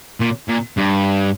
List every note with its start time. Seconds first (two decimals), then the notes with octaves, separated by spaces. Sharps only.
0.20 A#2
0.48 A#2
0.77 G2